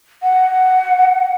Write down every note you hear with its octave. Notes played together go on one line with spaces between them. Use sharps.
F#5